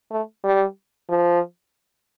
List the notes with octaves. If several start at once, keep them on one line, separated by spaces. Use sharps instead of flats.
A3
G3
F3